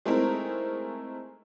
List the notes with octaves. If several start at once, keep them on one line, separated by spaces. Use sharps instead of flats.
G#3 A3 C4 D#4 E4 A#4